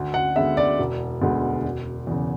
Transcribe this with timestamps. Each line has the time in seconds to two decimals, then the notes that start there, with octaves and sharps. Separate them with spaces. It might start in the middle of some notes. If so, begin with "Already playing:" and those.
Already playing: D2
0.14 F#5
0.36 D3 G#3 B3 E5
0.57 D5
0.79 E1
1.22 D2 D3 G#3 B3
1.65 E1
2.07 E2 C#3